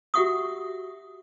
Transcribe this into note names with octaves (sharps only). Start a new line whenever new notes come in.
F#4 G4 E5 F#5 C#6 D#6